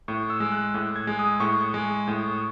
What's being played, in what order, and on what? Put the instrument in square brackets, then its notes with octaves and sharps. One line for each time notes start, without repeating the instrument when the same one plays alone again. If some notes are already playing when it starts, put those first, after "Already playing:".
[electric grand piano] A2 C#6
E6
G#3
F#6
A2
G#6
G#3
D#6
A2 C#6
G#3
A2